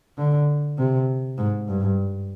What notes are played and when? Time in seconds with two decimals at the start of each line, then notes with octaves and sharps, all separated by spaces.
0.18 D3
0.78 C3
1.38 G#2
1.68 G2